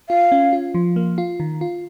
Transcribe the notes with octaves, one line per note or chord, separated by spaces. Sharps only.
F4 F5
C#4
F4
F3
A#3
F4
D#3
F4